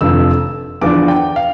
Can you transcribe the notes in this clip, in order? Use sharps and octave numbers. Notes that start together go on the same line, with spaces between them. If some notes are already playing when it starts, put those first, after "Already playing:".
F1 F2 D3 F3 E6
E2 D3 F3 B3 D4 D6
G5
F5